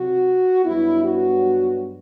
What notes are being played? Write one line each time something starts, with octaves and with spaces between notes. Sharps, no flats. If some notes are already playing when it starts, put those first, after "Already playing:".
Already playing: C3 F#3 C4 F#4
G2 F#3 B3 E4
F#4